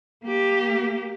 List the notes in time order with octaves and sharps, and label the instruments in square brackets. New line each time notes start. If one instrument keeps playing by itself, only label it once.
[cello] A#3 G4